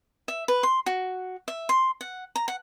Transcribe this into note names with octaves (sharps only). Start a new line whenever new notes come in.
E5
B4
C6
F#4
E5
C6
F#5
A#5
F#5